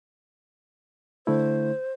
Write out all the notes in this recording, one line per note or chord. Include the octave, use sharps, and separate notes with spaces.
D3 A3 E4 C5